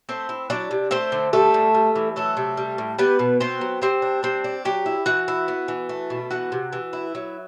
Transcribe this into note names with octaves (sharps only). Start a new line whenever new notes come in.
A3 C4 C5
E4
F#3 D4 D5
C3
A3 C4 C5
D3
G3 A3 A4
A2
G3
E3
F#3 A3 A4
C3
G3
A2
G3 B3 B4
B2
B3 C4 C5
F#3
G3 C4 C5
D4
G3 C4 C5
D4
F#3 G4
E4
E3 F#4 F#5
E4
B3
E3
A3
B2
E3 F#4 F#5
C3
E3
E4
F#3